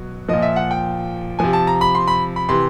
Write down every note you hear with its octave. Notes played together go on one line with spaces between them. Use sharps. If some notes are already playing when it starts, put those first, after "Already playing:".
Already playing: B2 F#3
A#2 F3 D#5
E5
F#5
G5
C3 F3 G#5
A5
A#5
B5
C6
B5
B5
C3 E3 C6